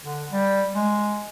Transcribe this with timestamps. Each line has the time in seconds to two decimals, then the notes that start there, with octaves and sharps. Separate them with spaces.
0.04 D3
0.31 G3
0.75 G#3